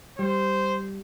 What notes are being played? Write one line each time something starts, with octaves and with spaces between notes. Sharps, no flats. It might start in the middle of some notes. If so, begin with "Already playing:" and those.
G3 C5